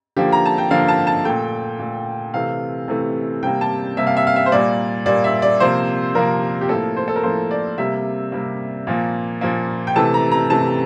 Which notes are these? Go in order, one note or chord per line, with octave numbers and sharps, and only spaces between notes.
D3 F3 A#3 G4
A#5
A5
G5
D3 F3 A#3 F5
A5
A5
A#2 A3 G5
A#2 A3
C3 E3 A3 F5
C3 E3 A3
C3 G3 A#3 G5
A5
C3 G3 A#3 E5
F5
E5
F5
E5
C5
A#2 G3 A#3 D5
A#2 G3 A#3 D5
E5
D5
C3 F3 A#3 C5
C3 F3 A#3 A#4
G4
A2 F3 A#3 A4
C5
A4
A#4
A2 F3 A#3 C5
D5
C3 G3 A#3 E5
C3 G3 A#3
A#2 F3 A#3
A#2 F3 A#3
G5
C3 E3 A3 A5
A#5
A#5
C3 E3 A3 A5